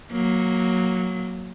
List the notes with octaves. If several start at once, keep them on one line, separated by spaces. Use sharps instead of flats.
F#3 A#3